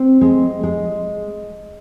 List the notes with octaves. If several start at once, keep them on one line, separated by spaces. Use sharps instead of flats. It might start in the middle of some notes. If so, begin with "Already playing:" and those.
Already playing: C4
G#3
G#3